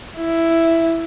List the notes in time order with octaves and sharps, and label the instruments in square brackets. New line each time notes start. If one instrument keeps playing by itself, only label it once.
[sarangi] E4